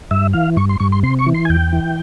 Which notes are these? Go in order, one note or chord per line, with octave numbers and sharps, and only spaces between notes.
G2 E5
E3 F5
G2 C#6
C6
G2 C#6
C6
C3 C6
C#6
E3
C6
G#5
E2 G5
E3